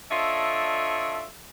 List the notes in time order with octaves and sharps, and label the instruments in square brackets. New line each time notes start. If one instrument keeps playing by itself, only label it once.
[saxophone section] D4 F4 A4 C#5 D#5 E5